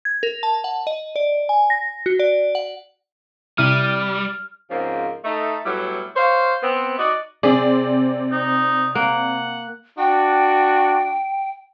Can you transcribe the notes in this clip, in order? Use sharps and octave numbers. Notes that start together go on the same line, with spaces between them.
G#6
A#4
A5
F#5
D#5
D5
G#5
A#6
F#4
D5
F#5
C3 G3 E4 F6 D#7
G#2 C#3 F3 A#3 C4 C#4
A3 D#4
A2 F#3 G3 B3 E4
C5 C#5 F5
B3 C4
D#4 F#4 D5 D#5
C3 C4 G#4 D5
D#4
A#3 F#5
D4 F#4 G5